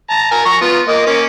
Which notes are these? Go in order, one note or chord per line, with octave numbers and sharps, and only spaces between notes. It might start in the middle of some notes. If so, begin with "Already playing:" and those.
A5 A#5
A#4 G#5
A#5 C#6
B3 F4
A#3 D#5
A#3 C#4